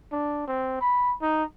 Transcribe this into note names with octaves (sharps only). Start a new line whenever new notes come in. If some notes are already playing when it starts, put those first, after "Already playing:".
D4
C4
B5
D#4